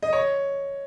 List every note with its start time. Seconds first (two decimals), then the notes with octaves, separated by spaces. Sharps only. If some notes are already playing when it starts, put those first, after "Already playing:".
0.03 D#5
0.13 C#5